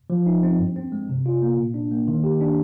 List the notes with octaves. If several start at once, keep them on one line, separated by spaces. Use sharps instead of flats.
F3
D#4
C4
G2
C4
G#3
C3
F4
A#3
A#2
D4
A#3
D#3
G4
D4